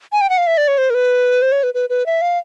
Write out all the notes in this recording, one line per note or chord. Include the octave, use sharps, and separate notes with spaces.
G#5
G5
F#5
F5
E5
D5
C#5
C5
A#4
B4
C5
C#5
B4
B4
B4
E5
F5